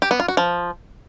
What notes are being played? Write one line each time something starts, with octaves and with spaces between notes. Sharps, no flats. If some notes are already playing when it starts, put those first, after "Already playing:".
G4
B3
F4
F#4
F3